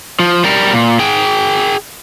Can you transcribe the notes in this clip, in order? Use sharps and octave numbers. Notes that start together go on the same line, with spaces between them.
F3
G3 A#4
A#2
G#4 G5